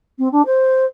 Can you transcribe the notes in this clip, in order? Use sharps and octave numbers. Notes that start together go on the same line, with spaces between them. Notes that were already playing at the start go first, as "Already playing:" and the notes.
C4
D4
C5